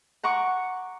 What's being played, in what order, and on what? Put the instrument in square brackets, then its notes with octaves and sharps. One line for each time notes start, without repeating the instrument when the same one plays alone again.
[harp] F#5 A#5 C#6 D6